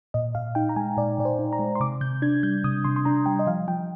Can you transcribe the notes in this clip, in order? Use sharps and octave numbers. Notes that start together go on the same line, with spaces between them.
A#2 D#5
A#2 F5
D#4 G5
A#5
G#3 G#5
A#2 D5
A#2 D5
C5
D#4
A#5
G#3
C6
C3 D6
C3 G6
D4 G#6
G3 G6
C3 D#6
C3 C6
C6
D4 A#5
G3 G5
D#5
F3 F5
F3 G5